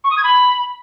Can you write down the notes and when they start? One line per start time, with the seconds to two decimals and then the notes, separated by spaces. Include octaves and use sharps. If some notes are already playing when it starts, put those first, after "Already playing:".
0.04 C#6
0.10 D#6
0.17 G#6
0.24 B5